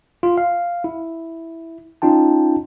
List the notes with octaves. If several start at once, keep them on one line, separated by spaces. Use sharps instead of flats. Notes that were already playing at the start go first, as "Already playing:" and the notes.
F4
F5
E4
C#4 D#4 F4 G5 A5